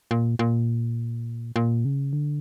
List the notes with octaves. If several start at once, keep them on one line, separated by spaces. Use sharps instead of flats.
A#2
A#2
A#2
C#3
D3